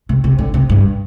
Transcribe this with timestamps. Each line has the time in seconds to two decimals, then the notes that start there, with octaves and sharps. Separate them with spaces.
0.09 C3
0.24 C3
0.38 D3
0.54 C3
0.69 G2